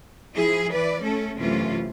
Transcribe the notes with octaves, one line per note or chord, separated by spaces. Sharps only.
F3 E4 G#4
E3 B4 D5
A3 C#4 A4
F#2 C3 E3 A3 C#4 F4